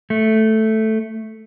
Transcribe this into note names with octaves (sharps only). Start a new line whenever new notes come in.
A3